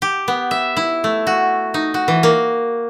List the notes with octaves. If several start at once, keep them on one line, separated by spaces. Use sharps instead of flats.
G4
B3
E5
E4
A3
F#4
D#4
F#4
E3
A#3